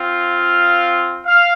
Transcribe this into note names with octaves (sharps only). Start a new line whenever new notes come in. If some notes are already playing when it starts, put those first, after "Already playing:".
Already playing: C4 F4
F5
F5